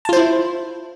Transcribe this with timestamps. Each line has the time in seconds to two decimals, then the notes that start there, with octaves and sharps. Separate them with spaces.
0.05 A5
0.09 F4
0.13 C5
0.17 E4